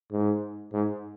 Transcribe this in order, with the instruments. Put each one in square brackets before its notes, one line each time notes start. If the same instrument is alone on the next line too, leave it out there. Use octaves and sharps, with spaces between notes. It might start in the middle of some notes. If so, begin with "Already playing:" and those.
[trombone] G#2
G#2